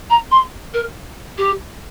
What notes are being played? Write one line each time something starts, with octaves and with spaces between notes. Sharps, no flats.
A#5
C6
A#4
G4